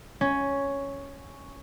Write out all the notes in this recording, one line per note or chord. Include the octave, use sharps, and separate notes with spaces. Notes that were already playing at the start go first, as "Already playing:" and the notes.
C#4